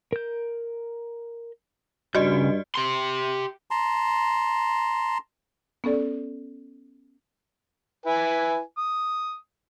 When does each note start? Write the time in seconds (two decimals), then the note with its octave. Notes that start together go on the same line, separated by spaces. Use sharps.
0.13 A#4 G6
2.15 G2 C#3 F#4 D5 D#5 G6
2.75 G4 C6
3.71 A5 A#5 C6
5.84 B3 C#4 A4 D5
8.06 E4 B4 G#5
8.78 D#6